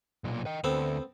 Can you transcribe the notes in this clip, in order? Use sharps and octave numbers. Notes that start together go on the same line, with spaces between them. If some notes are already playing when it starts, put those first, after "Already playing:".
B1 A#2
D#5 G5
D2 B3 C4 A4